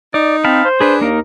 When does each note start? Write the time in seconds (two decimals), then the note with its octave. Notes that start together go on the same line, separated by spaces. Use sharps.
0.14 D#4 D5
0.44 C4 F5 A5 B5
0.65 C5
0.81 D4 G#4 B4
1.01 D#2 A#3 D#4 A#4